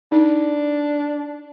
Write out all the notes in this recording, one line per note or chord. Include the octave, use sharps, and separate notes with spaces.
D4 D#4